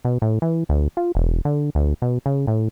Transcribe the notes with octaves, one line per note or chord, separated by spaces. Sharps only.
B2
A2
E3
D2
F4
E1
D3
D2
B2
C#3
A2